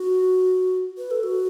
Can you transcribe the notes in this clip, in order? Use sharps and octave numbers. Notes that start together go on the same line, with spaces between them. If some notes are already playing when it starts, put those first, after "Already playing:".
Already playing: F#4
B4
A4
F#4